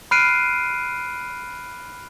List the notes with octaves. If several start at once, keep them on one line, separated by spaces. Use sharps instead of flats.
B5 F6 F#6 C7 D7 D#7